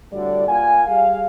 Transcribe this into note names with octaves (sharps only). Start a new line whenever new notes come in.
A2 D3 G3 F#4 D5
A#3 F4 F#5 G#5
G3 G#4 F5